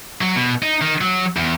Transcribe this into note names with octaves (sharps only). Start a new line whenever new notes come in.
F#3
B2
D#4
D#3
F#3
E2